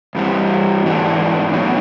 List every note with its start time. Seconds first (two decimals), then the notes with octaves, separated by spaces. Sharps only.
0.15 G2 E3 G3 C4
0.85 G#2 E3 A3 D4 F#4
1.53 A#2 F#3 B3 D#4 F#4